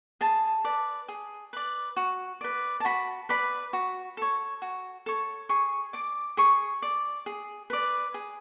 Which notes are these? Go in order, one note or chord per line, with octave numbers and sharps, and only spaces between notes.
G#4 A5
B4 D5
G#4
B4 D5
F#4
B4 D5
A5
F#4 B5
B4 D5 B5
F#4
A4 C#5
F#4
A4 C#5
G#4 C#6
D5 D6
G#4 C#6
D5
G#4
B4 D5
G#4